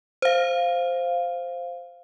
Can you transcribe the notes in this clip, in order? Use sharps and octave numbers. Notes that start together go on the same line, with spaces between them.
C5 F5